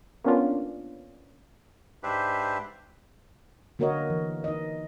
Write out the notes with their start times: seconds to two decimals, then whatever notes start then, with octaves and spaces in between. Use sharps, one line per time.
0.24 A#3 B3 C#4 D4 F4
2.03 G#2 D4 G4 B4 C5 E5
3.79 D3 A#3 F#4 A#4 C#5 D#5
4.10 E3
4.44 D#4 D#5